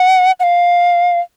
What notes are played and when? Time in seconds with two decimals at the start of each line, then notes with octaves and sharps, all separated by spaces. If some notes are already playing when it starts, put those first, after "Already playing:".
Already playing: F#5
0.40 F#5
0.43 F5